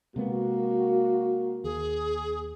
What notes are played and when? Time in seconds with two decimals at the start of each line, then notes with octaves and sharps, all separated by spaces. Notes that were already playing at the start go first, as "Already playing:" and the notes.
0.16 C3 G#3 A#3 B3 F#4
1.64 D#2 G#4